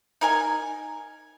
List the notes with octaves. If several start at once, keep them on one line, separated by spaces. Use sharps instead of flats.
D#4 A#4 G#5